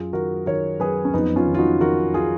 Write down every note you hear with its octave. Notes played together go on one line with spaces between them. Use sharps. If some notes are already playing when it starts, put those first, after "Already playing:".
Already playing: F#2 F4 G#4
D#3 F#4 A#4
D#3 A#4 C#5
F#2 G#4 B4
C#4
F2 B3 D#4
C#4 F4
D#3
F4
D#4 F#4
D#3 F#4 A#4
F4 G#4